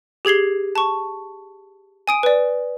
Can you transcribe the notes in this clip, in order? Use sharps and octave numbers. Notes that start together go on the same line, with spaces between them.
G4 G#4 G#6 C7 G7
A5 C#6
G#5 D#6 D7
B4 D5